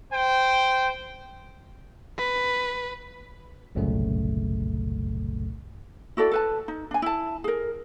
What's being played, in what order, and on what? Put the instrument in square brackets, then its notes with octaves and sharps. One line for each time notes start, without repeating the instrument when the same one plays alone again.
[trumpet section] C5 G5
[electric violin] B4
[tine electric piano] G1 C2 F#2 A#2 C#3 A3
[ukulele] E4 F#4 A4 D5
A4 B4 A5
D#4
D4 G#5
E4 A5
G#4 A#4